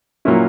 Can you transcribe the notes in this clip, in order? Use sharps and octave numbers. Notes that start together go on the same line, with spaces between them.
A#2 F#3 A#3 C#4 E4